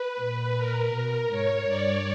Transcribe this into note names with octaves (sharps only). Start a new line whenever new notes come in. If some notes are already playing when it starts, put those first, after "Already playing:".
Already playing: B4
A#2
A#4
B2
G#2 C#5
G2 D5